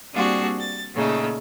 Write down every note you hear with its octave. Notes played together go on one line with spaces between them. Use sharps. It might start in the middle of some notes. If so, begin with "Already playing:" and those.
G3 A#3 C4 D4 F#4 G#4
A6
A#2 C#3 A3 D#4